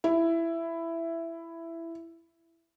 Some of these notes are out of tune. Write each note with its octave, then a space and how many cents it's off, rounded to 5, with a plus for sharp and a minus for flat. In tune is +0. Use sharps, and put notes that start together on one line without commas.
E4 +10